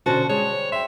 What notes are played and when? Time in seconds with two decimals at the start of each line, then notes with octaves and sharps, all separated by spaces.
0.06 B2 D3 C#4 F#4 C5 A5
0.29 G3 G#3 G#4 C#5
0.53 C5
0.72 E5 G5 C6